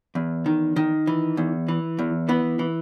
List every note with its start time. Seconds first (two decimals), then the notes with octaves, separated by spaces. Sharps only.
0.15 E2
0.46 D#3
0.76 D#3
1.07 E3
1.37 E2
1.68 E3
1.99 E2
2.29 E3 B3
2.59 E3